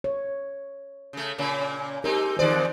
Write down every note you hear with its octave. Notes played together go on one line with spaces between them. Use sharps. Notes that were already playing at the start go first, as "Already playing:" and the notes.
C#5
C#3 A3
A#2 C#3 A#3
G#3 C4 D#4 G4 A#4
E2 D#3 G#3 C5 D5